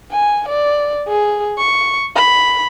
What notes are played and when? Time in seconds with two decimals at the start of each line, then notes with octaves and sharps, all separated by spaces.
0.12 G#5
0.49 D5
1.09 G#4
1.58 C#6
2.16 B5